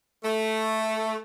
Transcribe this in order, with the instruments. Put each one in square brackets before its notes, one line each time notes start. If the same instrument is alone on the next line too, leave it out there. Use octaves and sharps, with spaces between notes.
[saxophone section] A3